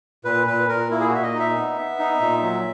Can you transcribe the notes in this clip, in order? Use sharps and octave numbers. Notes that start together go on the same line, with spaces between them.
A#2 B4
A#2 B4
A#2 A#4
A#3 E4
G#4
F#4
A#2 E5
D#5
D#4
E5
B3
B3
D#4
A#2
F#3